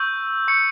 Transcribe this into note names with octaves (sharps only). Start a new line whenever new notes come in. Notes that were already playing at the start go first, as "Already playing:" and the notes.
Already playing: C#6 E6 G6
C#6 G6 C#7